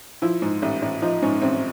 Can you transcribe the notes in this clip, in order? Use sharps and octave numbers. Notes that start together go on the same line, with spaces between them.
F3 E4
G#2
A1
A1
F3 D#4
G#2 C#4
A1 C4